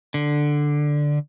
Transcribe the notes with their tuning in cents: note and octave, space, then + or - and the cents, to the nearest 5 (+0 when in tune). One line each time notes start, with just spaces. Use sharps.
D3 +5